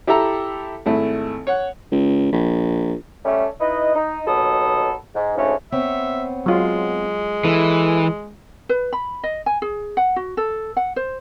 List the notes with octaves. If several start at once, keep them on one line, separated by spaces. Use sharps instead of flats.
E4 G4 A4 E5 A#5
G#1 A3 E4
C#5 F#5
C#2
A#1
G3 A3 C#4
D#4 E4 B4 D#5
D#4
D#2 B2 F#3 A4 B5 D#6
G#2
D2 G#2 C#3 A3 C#4
B3 C4 C#5 E5
F#3 G#3 F4
E3 E4 A4
B4
B5
D#5
G#5
G#4
F#5
F#4
A4
F#5
C5